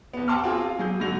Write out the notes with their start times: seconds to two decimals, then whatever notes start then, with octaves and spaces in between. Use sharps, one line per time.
0.13 E2 B3
0.28 F#5 G5 A5 C6 D6 F6
0.43 C4 F4 G#4
0.61 F5
0.79 F#3 G#4 G6
1.00 G#2 D3 F#3 F#4 A#6 F7